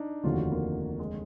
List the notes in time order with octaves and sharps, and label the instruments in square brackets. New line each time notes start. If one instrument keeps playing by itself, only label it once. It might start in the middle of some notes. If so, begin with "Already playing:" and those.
Already playing: [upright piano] D4 D#4
[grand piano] F1 D#2 D3 [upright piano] F4
[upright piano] F#4
A#3
G#3